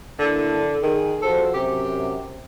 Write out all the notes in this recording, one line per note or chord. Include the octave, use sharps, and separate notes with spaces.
D3 A#3 D4 E4
D#3 G#4
F3 F#4 A4 C5
F#2 C3 G4